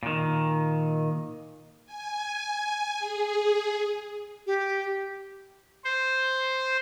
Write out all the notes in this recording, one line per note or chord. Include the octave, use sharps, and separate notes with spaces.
A#2 D#3
G#5
G#4
G4
C5